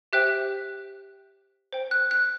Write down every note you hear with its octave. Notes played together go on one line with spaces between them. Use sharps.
G4 C5 E5 G5 F#6
C5 G5
F#6
F#6